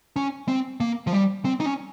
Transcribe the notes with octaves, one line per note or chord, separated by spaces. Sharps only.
C#4
C4
A#3
F3
G3
C4
D#4
C#4